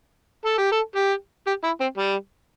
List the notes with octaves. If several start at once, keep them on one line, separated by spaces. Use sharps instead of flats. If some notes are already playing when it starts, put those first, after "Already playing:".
A4
G4
A4
G4
G4
E4
C4
G3